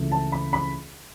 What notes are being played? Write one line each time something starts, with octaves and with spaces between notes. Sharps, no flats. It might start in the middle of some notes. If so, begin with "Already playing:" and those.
Already playing: C#2 C#3 E3 A3
A5
B5
B5